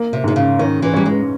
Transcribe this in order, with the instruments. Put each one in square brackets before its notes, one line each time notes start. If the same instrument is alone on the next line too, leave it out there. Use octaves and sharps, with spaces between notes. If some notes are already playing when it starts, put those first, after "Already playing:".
Already playing: [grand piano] A#3
[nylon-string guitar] C3
[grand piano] G#2 [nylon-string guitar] C3
[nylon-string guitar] C#3
[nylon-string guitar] D#3 [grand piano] C#4
[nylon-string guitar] E3
[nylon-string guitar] G3 [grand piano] C#4
[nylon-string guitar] G#3